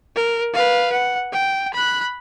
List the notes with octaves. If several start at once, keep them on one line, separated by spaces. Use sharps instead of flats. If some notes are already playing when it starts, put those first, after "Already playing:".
A#4
B4 F5
F#5
G5
B5 F#6